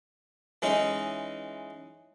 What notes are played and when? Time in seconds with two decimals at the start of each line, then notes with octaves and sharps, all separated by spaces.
0.62 E3 G#3 C#4 D#4